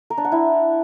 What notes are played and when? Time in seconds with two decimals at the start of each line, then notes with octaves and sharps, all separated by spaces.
0.10 A#4
0.18 D4
0.25 F#5
0.32 E4